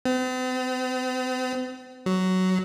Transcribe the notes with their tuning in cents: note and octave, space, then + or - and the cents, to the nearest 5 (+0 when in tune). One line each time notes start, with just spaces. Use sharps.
C4 -45
F#3 +10